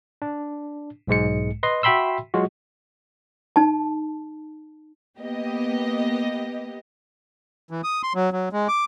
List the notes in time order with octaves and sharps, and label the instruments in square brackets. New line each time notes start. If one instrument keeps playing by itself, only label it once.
[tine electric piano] D4
B1 G#2 G#3 C#7
B4 D#5 C6
F#4 E5 G5 B5 C6 E6
F#3 G#3 F4 F#4
[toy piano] D#4 A5
[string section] A#3 B3 G4 D#5
[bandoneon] E3
D#6
C6
F#3
F#3
G#3
D6